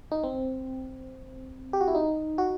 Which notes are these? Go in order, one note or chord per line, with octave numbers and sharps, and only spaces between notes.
D#4
C4
G4
F#4
E4
D#4
F#4